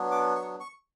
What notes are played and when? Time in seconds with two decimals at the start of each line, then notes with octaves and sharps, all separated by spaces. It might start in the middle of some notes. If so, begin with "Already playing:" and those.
Already playing: F#3 B3 D4
0.12 D6
0.36 C#6
0.60 C#6